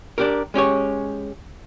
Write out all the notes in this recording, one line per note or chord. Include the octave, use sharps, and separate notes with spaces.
D4 G4 A#4
G#3 C#4 G4 C#5